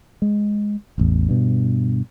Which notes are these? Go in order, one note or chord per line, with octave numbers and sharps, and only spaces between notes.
G#3
D#1 A1 E2
G2 B2